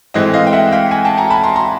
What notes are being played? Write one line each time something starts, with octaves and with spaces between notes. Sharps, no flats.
A2 E3 G#3 C4 D#5
D#5 F5
G5
E5 F#5
F5 G5
F#5 G#5
G5 A5
G#5 A#5
A5 B5
A#5 C6
A#5 C6